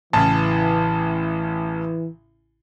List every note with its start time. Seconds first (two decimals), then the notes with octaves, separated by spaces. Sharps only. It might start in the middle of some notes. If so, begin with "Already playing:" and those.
0.13 A1 C#3 E3 A5